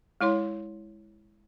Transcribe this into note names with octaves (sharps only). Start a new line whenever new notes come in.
G#3 E4 C#5 C6